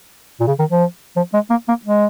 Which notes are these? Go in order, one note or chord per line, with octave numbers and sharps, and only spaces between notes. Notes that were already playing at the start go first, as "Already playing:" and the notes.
A#2
C#3
D#3
F3
F3
G#3
A#3
A#3
G#3